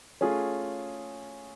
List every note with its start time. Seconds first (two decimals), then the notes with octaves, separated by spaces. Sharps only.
0.21 A3 C#4 F4 G#4